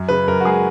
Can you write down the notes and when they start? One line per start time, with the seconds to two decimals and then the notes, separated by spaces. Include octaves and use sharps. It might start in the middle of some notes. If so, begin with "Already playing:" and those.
Already playing: F#2
0.08 C#3 B4
0.27 F#2 A#4
0.40 F#4
0.45 G#3 G#4